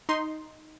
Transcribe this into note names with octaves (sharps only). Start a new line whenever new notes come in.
D#4 C6